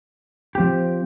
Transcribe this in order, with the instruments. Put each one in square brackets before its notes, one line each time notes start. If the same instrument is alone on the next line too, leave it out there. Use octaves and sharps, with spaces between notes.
[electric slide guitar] F3 C4 G4